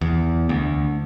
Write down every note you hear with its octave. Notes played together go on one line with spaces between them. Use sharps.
E2
D2